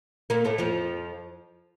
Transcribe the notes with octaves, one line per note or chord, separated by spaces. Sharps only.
A#2 A#3
A2 A3
F2 F3